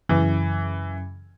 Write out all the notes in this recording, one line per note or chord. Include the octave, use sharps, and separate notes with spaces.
F#2 C#3 E3